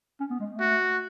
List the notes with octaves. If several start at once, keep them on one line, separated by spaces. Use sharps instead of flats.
C#4
B3
G#3
A3
F#4